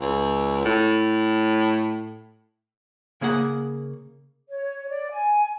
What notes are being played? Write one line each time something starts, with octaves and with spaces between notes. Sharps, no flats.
C#2
A2
C#3 A#3 G#4 F#5
C#5
D5
G#5